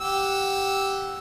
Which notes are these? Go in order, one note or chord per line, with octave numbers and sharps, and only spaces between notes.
G4 F#5 E6